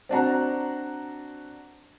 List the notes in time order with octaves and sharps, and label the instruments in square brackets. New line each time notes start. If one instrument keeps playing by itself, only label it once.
[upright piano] C4 D4 F#4 A#5